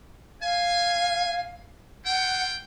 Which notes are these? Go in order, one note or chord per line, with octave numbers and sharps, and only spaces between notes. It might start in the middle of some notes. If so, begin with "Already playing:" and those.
F5 G#5
F4 C5 F#5 G5